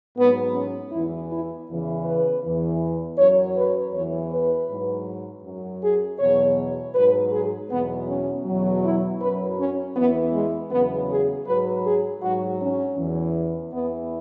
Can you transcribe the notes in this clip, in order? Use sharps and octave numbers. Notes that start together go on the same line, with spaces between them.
G#2 F#3 B3
C#4
E2 E3 E4
E4
E2 C#3 E3
B4
E2 E3
F#2 F#3 C#5
B4
E2 E3 C#5
B4
G#2 F#3
F#2 F#3
G#4
E2 B2 F#3 C#5
G#2 F#3 B4
G#4
E2 B2 F#3 B3
C#4
E2 B2 F#3
E4
F#2 F#3 B4
C#4
E2 E3 B3
G#3
E2 C#3 F#3 B3
G#4
G#2 F#3 B4
G#4
G#2 F#3 F#4
C#4
E2 E3
E2 E3 B3